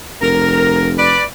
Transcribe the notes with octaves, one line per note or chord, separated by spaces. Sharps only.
F1 A#4
B4 D5